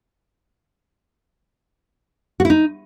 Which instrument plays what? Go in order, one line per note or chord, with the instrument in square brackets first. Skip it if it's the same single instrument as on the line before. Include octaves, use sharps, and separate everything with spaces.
[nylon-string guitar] F#4
E4
D#4